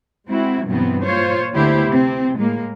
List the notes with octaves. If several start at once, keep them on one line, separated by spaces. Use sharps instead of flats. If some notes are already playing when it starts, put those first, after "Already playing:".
G#3 C4 E4 F#4
G2 B2 E3 F#3 B3 C4
A#2 F4 C5 C#5
D2 D3 B3 E4 G4 C5
C3 C4
A2 G#3 A#3